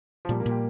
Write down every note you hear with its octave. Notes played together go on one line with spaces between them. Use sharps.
F3
A#2 G3
A#3
A#2
G4